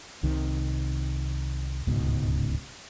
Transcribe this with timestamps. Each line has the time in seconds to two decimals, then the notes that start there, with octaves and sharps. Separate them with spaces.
0.23 C2 C3 D#3
1.87 D1 C#2 G#2 B2